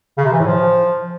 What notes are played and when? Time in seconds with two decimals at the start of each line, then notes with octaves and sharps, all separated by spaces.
0.18 C#3
0.25 C3
0.32 E3
0.40 A2
0.47 F3